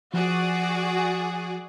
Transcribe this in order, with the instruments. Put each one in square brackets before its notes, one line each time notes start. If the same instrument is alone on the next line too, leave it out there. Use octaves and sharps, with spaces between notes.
[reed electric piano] F3 [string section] F#4 G#4 D5